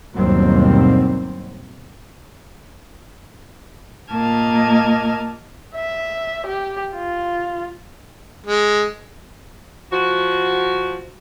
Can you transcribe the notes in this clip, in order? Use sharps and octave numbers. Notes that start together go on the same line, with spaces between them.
G1 D#2 B2 F#3 G3 C4
A#2 A#3 D#5 A5 F6 G#6
E5
G4
F4
G#3
F3 F#4